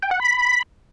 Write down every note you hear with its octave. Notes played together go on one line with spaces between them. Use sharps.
G5
F#5
B5